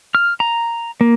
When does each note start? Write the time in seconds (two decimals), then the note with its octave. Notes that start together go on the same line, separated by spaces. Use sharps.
0.15 F6
0.40 A#5
1.01 A#3